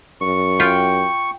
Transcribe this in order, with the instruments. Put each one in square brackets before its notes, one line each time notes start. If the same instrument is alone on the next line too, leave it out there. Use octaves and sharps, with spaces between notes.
[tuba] F#2 [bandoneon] C#6
[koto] F4 [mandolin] G5